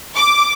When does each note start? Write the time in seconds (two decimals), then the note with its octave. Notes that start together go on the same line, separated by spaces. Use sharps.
0.16 D6